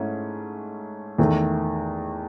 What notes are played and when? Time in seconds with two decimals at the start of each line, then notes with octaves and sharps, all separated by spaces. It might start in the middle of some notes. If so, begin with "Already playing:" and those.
Already playing: G#2 A3 C#4 E4
1.18 E2 D#3 A3